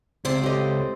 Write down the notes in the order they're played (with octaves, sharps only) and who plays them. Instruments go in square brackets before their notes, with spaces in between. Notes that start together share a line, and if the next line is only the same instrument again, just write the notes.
[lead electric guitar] C#2 [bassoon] C3 [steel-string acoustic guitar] C4 C5 D5
[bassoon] A2 [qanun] G4 D#5